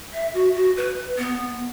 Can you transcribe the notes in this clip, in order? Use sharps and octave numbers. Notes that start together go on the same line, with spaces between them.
E5
F#4
F#4
B4
B3